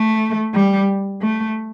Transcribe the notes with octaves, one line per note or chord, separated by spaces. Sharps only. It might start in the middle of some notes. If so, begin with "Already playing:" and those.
Already playing: A3
G3
A3